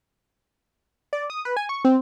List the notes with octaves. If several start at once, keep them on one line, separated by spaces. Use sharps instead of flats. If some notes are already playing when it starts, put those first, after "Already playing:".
D5
D#6
B4
G#5
C#6
C4